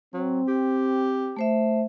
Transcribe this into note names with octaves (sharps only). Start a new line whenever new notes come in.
F#3 C4
G4
A3 C5 E5